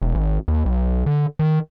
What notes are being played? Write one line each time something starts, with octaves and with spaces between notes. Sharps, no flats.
E1
G#1
D#2
B1
D3
D#3